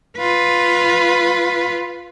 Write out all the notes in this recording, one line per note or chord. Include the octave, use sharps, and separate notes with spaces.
F4 B4